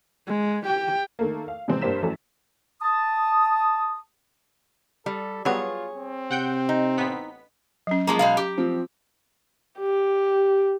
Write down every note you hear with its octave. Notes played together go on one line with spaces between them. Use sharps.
G#3
G4 G5
D#3 A3 A#3
F5
C3 E3 G#3 C4
G2 A#3 G4 C5 B6 E7
F#2 E3 F#3 A3
A5 D#6
G3 A4
F#3 G3 B3 F4 G#4 C#5
C4
C3 F#5 G5 G6
D#4
A1 B3 B6
F#3 C#4
F3 G#3 A#3 A#5
B2 G#3 F5
G4
F3 C4
G4